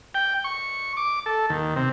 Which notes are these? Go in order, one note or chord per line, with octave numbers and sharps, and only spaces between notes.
G5
C#6
D6
A4
D#2
C3